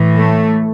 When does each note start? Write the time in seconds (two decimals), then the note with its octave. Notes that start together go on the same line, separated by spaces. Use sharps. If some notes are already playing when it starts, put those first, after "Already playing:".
Already playing: A2 E3
0.17 A3